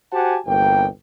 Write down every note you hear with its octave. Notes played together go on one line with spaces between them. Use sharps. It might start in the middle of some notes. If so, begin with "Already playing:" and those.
F#4 G4 C5 F#5 G#5 A5
G1 C2 A#3 G5